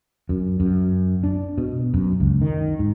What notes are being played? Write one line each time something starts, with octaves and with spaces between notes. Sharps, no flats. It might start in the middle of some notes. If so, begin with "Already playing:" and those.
F#2
F#2
D4
B2
F#2
C#2
D#3
G#2